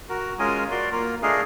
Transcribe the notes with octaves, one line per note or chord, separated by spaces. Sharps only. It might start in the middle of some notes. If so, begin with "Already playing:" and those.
F#4 A#4
G#3 C#4 F4 A#4 D#5 G#5
F#4 A#4 D5 C6
A#3 F4 A#4
A3 D4 G#4 A#4 D#5 F5